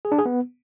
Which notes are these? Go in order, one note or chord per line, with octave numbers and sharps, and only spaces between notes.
G#4
D4
G#4
B3